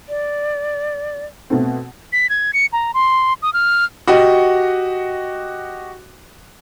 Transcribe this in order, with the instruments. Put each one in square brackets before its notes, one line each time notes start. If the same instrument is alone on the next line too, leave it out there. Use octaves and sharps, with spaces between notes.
[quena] D5
[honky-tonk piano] B2 A3 C4
[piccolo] B6
G#6
C#7
A#5
C6
D#6
F6
[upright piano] F#4 G4 D#5 F#5